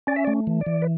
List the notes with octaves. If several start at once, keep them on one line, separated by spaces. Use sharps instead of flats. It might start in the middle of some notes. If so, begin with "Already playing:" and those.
C#4 D5
E5
A3 D5
E3
D5
E3
B4